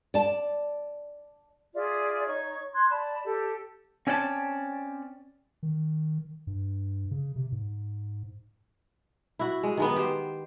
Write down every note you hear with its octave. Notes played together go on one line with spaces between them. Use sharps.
D5 A5
F4 G#4 D5 E5
D#4 C#5 C#6
C6 F#6 G#6
D5 A5 B5
G4 A4
C4 C#4 C#5 D5 F#5 A5
D#3
G2
C#3
C3
G#2
E4 F#4
G#3
D#3 G#3 B3
G4 C5